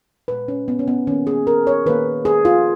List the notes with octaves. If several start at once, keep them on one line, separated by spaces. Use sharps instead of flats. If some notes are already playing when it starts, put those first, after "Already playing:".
A#2 G#3 B4
C#4
B3
C#4
B3
D#3 A#3 C#4
G#4
A#4
C#5
D#3 A#3 B4
G#4
F4